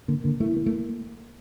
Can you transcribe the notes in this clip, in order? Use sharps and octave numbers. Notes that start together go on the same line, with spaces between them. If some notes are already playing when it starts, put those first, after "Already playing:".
D3 A#3
D3 A#3
A3 E4
A#3
A3